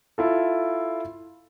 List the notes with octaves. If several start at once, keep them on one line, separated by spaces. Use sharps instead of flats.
E4 F4 A4